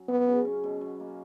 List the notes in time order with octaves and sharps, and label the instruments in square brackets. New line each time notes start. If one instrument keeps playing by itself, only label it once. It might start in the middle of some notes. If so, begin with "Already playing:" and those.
Already playing: [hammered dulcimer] F#3 C#4
[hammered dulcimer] F#2 [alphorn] B3
[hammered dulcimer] C#3
C#4
B2
B2
A#3